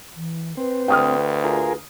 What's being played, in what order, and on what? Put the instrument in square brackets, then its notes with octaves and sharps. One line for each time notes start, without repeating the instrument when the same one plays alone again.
[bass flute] E3
[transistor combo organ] C4 [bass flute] B4
[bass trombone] D2 [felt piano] G5 D#6 F6
[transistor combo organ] F4 G#4 A#4